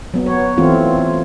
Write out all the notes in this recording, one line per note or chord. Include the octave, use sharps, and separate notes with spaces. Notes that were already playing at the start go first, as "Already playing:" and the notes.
F#3 B3
C#5
E3 A3 C4 F4